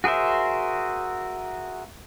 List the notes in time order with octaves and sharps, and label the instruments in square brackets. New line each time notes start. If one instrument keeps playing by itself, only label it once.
[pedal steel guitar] F#4 G#4 A#4 C5 E5